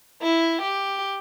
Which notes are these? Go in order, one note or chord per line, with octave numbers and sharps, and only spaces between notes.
E4
G4